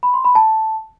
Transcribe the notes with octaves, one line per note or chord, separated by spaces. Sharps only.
B5
C6
B5
A5